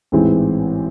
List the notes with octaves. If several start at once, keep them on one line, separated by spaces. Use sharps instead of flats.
A1 G#2 E3 G#3 C4